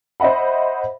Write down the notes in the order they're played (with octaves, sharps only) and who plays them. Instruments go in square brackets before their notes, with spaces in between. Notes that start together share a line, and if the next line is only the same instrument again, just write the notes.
[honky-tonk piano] C5 D#5 E5 F#5 B5